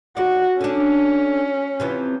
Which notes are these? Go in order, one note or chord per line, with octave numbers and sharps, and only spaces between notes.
D#2 F#4 D5
D3 C#4 D4
C3 E3 F3